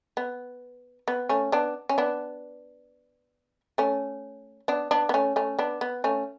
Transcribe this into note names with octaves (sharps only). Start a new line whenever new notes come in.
B3
B3
A3 C#4
B3 D4
C#4
B3 D4
A3 C#4
B3 D4
B3 D4
B3
A3 C#4
A3 C#4
B3 D4
B3
A3 C#4